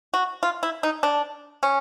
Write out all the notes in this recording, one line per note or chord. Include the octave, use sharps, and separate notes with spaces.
F#4
F4
E4
D#4
D4
C#4